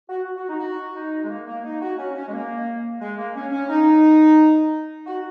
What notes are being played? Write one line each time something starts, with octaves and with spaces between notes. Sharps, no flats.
F#4
F#4
D#4
F#4
D#4
G#3
A#3
A#3
D#4
F#4
C#4
C#4
G#3
A#3
G#3
A#3
C#4
C#4
D#4
F#4